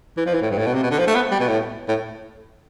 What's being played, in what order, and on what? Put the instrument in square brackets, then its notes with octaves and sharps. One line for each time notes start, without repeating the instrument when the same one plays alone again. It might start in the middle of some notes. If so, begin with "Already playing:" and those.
[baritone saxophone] E3
F3
E3
A2
G2
A2
B2
C3
B2
D3
F3
A3
B3
G3
B2
A2
A2